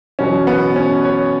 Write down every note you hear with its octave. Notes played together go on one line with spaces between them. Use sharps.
E2 B2 F#3 C#4
B3
C#4
C#5